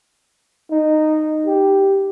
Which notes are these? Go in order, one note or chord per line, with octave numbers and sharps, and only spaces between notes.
D#4
G4